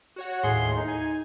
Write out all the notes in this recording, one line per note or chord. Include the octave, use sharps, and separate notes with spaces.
F#4 C#5 F#5
D#2 A2 G#4 C6
D#4
G#5